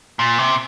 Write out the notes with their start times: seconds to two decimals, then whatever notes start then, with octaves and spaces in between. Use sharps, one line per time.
0.19 A#2
0.38 C3